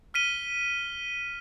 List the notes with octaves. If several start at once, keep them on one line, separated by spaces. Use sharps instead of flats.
F6 B6 D#7 G7